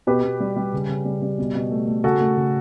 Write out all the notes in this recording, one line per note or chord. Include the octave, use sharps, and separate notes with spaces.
B2 G4 B4
B2
G3
G3
C#3
C#3
G3
G3
B2
B2
A3
A3
C#3 F#4 A4
A3
C#3